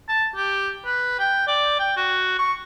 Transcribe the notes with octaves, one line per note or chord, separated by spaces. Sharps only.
A5
G4
B4
G5
D5
G5
F#4
C#6